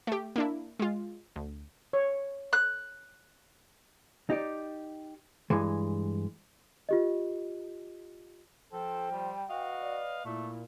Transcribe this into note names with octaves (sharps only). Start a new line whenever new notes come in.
A3 G4
A#3 D4 E4
G#3 F4
D2
C#5
F#6
D#4 G4 D5
G2 E3 G#3
F4 G4 D#5
F3 A4 C5 G5
G3
F#4 B4 D#5 F5
D5
A#2 A3 E4